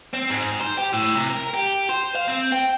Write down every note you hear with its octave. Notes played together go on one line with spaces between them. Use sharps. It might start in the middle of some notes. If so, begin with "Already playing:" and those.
C4
G#2
C5
G4
A2
C3
A#4
G4
C5
F5
C4
G5